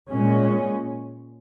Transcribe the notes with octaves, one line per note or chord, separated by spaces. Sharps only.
A#2 G#3 C#4